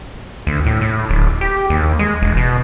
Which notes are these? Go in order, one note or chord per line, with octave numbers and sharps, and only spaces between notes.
D2
A2
A2
D1
G4
D#2
G#3
E1
B2